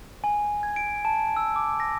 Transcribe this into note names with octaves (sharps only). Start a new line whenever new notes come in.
G#5
G#6
D7
A5
E6
D6
A#6